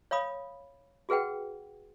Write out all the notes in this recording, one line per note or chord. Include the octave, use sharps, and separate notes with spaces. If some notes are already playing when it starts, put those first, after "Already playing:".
C#5 F5 B5 D#6
F#4 G#4 B4 F#5 G5